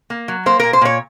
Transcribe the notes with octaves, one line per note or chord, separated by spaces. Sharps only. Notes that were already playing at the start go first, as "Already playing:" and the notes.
A#3
F#3
A#3 C5
A#2 A#4
C5
A#2 C#5